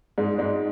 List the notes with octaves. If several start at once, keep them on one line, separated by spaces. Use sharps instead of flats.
G#2 G#3
G#2 G#3